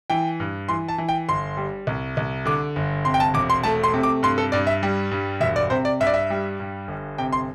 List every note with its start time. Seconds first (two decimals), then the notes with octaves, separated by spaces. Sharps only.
0.10 E3 G5
0.40 G2
0.69 E3 C6
0.89 A5
0.98 E3
1.09 G5
1.28 G1 C6
1.57 G3
1.87 C2
2.17 C2
2.46 D3 D6
2.76 G1
3.05 C3 C6
3.14 G5
3.20 A5
3.34 E1 D6
3.50 C6
3.64 A3 A5
3.84 C6
3.94 C3
4.03 D6
4.23 G2 C6
4.38 A4
4.52 G2 D5
4.67 E5
4.83 G3
5.11 G2
5.41 E1 E5
5.56 D5
5.70 C3 C5
5.85 D5
6.00 G2 E5
6.07 D5
6.14 E5
6.30 G3
6.60 G2
6.88 G1
7.18 C3 G5
7.33 C6